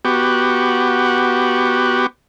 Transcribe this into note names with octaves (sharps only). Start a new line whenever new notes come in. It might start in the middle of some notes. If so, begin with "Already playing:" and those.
B3 F#4 G4